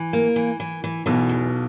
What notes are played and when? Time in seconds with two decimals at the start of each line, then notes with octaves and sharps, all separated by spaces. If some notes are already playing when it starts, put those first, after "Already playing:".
Already playing: E3
0.13 A#3
0.36 E3
0.60 E3
0.84 E3
1.06 B1 B2 E3
1.29 E2